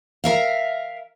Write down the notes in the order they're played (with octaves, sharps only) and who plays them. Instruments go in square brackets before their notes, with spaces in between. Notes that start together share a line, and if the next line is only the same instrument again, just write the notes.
[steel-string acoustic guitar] A#4 E5 F5